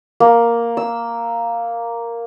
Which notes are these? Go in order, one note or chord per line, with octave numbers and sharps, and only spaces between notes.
A#3
E6